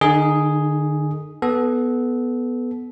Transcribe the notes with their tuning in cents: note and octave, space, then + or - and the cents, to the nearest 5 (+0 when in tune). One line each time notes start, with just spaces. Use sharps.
D3 +40 D#4 +0 G#4 +0
B3 +0 A4 -25